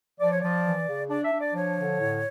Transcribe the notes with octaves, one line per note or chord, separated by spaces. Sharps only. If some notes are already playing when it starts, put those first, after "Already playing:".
F3 D5
C#5
F3 D5
E3
C#3
D4 D5
E5
D4
D5
F3 C#5
D3
A2